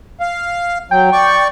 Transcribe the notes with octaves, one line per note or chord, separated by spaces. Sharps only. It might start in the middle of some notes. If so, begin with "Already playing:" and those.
F5
F#3 G5
D5 C#6